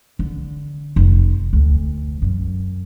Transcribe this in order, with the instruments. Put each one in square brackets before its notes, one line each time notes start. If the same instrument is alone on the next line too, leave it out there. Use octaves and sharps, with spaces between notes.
[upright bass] D3
F1
D2
F#2